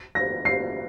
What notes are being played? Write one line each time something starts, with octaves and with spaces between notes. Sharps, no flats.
A#6
C7